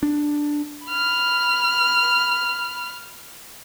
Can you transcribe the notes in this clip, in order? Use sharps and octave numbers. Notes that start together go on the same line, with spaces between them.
D4
B5 F6